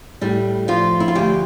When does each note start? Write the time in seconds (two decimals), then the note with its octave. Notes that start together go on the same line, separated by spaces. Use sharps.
0.21 A2 G3
0.68 F3 F4
1.00 E4
1.08 F4
1.15 D2 G4